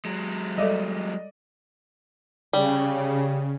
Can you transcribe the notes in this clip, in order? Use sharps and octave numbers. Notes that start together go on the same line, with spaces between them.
F#3 G#3
G3 A4 D5 D#5
C#3 G3